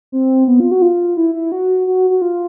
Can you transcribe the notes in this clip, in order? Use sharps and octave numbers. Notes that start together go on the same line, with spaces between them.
C4
B3
F4
F#4
F4
E4
E4
F#4
F#4
F#4
F4